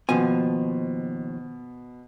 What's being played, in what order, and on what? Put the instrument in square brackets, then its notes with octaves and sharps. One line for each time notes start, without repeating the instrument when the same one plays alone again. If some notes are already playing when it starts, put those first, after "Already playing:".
[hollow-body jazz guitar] D#2 F3 G#5 [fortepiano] B2